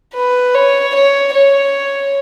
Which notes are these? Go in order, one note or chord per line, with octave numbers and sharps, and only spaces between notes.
B4
C#5
C#5
C#5